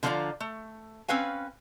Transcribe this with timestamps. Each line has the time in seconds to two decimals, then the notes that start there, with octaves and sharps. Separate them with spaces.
0.03 D3 F3 C4 F4 D5 A#5
0.40 A3
1.08 C4 C#4 B4 F5 G#5